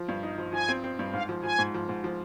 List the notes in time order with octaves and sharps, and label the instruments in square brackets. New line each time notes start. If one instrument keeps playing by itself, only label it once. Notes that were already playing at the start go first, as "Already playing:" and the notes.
Already playing: [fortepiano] F3
G2
D#4
F3
[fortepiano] F3 [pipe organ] G#5
[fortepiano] C4
C4
G2
[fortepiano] G#2 [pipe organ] F5
[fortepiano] F3
[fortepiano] F3 [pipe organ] G#5
[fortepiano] G#2
F3
G#2
F3